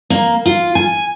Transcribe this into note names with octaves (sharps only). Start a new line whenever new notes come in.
A#3
F4
G#5